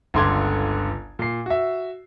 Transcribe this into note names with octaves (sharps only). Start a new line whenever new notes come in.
G1 C#2 D3 C6 D6 G#6
A#2 C7
F#4 E5